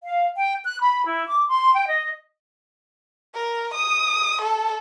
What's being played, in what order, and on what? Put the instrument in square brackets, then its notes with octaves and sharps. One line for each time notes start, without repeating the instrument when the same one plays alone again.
[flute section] F5
G5
F#6
B5
E4
D6
C6
G5
D#5
[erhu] A#4
D#6
A4